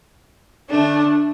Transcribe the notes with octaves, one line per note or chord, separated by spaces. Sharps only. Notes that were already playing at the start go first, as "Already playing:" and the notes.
D3 A3 D4